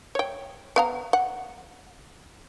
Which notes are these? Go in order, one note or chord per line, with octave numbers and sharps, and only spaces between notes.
C#5 G5
B3 F5 A#5
F#5